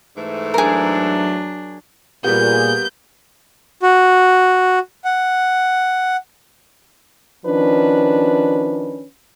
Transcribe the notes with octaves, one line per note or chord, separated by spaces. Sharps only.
G#2 E3 A3
F#3 D4 G#4 A#4
A#2 G3 A#3 B3 G4 G#4 G6
F#4
F#5
D#3 F3 C#4 D4 B4